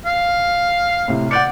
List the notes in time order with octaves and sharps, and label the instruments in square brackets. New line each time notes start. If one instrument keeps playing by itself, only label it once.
[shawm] F5
[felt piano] A2 C3
[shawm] D5 [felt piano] F#5 G6 C#7